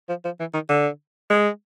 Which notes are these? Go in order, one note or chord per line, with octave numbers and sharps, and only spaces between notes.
F3
F3
E3
D#3
D3
G#3